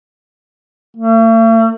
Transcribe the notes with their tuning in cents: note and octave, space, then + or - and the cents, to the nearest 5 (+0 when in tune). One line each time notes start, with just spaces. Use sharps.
A3 +45